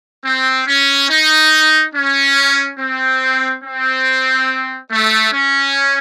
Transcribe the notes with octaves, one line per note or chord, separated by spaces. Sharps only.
C4
C#4
D#4
C#4
C4
C4
A3
C#4